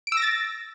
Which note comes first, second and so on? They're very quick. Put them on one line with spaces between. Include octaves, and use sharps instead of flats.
D7 E6 A#6 A6